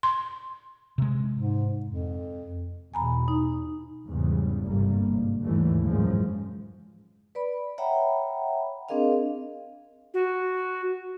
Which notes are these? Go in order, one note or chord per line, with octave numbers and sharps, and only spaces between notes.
C6
C3 G#3
G#2
F2
E2 B2 G#5 A#5 B5
D#4
E2 G#2 C#3 G3
G1 G2 C3 G3 A#3
G#2
D#2 G#2 D3 E3 G3 A3
F#2 A2 C#3 F3 G#3
B4 D5 B5
C#5 E5 F#5 G5 A#5 B5
C4 D4 G#4 A#4 D#5 F5
F#4